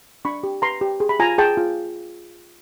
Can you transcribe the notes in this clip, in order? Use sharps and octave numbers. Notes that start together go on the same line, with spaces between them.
D4 B5 C#6
G4
B4 A#5 C6
G4
G#4
B5
F4 G#5 A#5
G#4 G5 A5
F4